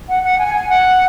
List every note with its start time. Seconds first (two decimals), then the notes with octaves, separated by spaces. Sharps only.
0.09 F#5
0.23 F#5
0.38 G#5
0.54 G#5
0.69 F#5